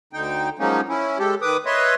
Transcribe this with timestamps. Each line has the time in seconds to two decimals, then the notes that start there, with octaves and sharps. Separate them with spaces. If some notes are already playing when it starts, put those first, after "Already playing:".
0.13 D2 D3 D#4 G5
0.59 F3 F#3 G#3 A#3 C#4 D#4
0.89 C#4 E4
1.19 G#3 G4 A4
1.42 D#3 B4 D6 D#6
1.66 B4 C#5 D#5 E5 C6